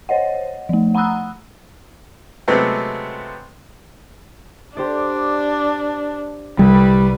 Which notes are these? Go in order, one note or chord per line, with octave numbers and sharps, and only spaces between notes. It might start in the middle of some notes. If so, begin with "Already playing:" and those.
C5 C#5 D#5 F#5
F3 A3
F#5 A#5 B5 D#6 E6 F#6
C3 F#3 G#3 A3 B3 C4
D4 G4 C5 D5
C2 G3 B4